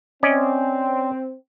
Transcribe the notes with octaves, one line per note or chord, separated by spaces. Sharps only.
C4 C#4 D5 D#5